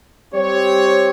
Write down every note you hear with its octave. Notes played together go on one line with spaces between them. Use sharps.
G3 C4 G4 C#5